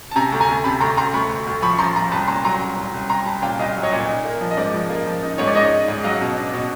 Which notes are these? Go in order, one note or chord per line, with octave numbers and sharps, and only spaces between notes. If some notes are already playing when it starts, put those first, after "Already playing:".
A5
C3 G#5 A#5
D2
G#5 A#5
D2
C3 A5 B5
D2 A#5 C6
D2 A#5 C6
D2 B5 C#6
D2
D2
F3 B5 C#6
F3 A#5 C6
F3 A#5 C6
C2 A5 B5
A#2 A#5 C6
F#3 A#5 C6
C2
C2
C2
C2 A#5 C6
C2 A5 B5
A#2 F5 G5
C2 D#5 F5
F#3
C#5 D#5
A#2
D#4
A#3
F3
D#5
G#2 C5 D5
F3
A#3
F3
D#4
G#2 C#5
D5
D#4 C#5 D#5
D#4
G#2
F#3 D#5 F5
B2
D4
B2